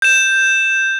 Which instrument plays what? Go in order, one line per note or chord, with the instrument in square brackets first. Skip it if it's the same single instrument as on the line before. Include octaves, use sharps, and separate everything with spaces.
[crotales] G6 E7